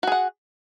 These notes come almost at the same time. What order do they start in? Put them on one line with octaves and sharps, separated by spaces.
F#4 G#4 F#5